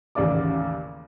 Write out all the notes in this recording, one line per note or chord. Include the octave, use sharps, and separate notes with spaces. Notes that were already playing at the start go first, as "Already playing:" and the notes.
A1 D#2 C#3 D5 D6